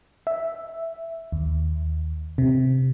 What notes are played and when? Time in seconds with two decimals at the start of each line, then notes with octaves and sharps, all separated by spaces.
0.27 E5
1.32 D#2
2.38 C3